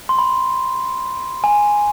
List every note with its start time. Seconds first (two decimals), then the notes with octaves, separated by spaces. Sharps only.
0.09 C6
0.19 B5
1.44 G#5